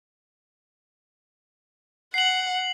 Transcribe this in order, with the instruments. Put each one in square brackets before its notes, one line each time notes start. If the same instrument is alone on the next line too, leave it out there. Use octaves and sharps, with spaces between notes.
[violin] F#5 [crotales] C7 F#7